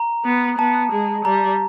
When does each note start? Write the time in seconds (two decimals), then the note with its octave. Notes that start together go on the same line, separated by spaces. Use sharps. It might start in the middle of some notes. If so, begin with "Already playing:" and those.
Already playing: A#5
0.25 B3
0.59 B3 A5
0.92 G#3
1.25 G3 A#5